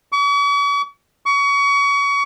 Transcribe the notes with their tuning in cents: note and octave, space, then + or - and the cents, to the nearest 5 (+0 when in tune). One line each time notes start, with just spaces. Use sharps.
C#6 +45
C#6 +30